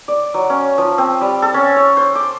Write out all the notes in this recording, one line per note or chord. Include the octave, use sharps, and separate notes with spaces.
D5
F#3
C#4
F3
C4
G3
A4
C#4
C#5
C5
D6